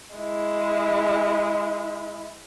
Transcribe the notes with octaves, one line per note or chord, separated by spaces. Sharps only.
G#3 E4